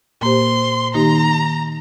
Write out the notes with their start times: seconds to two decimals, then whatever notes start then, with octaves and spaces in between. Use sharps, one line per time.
0.21 A#2 A#3 G4 C5 C6
0.94 D#3 A#3 D#4 G4 A#5